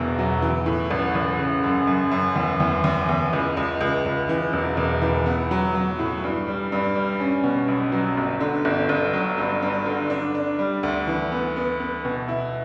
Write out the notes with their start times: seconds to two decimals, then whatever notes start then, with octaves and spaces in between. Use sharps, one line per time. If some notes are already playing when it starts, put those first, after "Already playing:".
Already playing: E1 E2 B2
0.18 F#3
0.42 E3
0.66 A2
0.91 A1
1.15 A1
1.39 C#3
1.64 F#2
1.87 F#2
2.11 F#2
2.36 E2
2.60 E2
2.84 E2
3.09 E2
3.33 C#2
3.57 C#2
3.81 C#2
4.06 C#2
4.29 E3
4.53 E1
4.77 E1
5.02 E3
5.26 B3
5.51 F#3
5.75 F#3
5.99 A2
6.24 G2
6.48 G3
6.72 G2
6.95 G3
7.20 C#4
7.44 B2
7.68 B1
7.92 F#3
8.17 G1
8.40 D3
8.65 G1
8.89 G1
9.13 F#3
9.38 G2
9.62 G2
9.86 D3
10.10 D4
10.35 D4
10.59 G3
10.83 D2
11.07 E3
11.32 B3
11.56 B3
11.80 B3
12.05 B2
12.28 E4